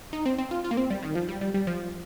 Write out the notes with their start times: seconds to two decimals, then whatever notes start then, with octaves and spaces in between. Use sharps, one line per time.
0.13 D#4
0.26 C4
0.38 C4
0.51 F4
0.64 F4
0.71 A#3
0.77 C4
0.90 G3
1.03 D#3
1.15 F3
1.29 G3
1.41 G3
1.54 G3
1.67 F3